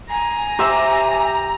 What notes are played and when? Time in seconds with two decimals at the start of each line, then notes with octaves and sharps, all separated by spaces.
0.10 G#5 A#5
0.59 G4 C5 E5 D6